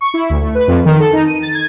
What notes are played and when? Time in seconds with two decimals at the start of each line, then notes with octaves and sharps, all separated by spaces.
0.01 C#6
0.14 E4
0.30 D2
0.41 A3
0.55 B4
0.68 F2
0.85 D#3
1.00 A4
1.13 D#4
1.27 D#7
1.42 A6
1.54 G#6